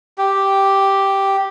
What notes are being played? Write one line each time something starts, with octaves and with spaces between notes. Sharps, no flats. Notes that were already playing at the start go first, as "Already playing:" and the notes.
G4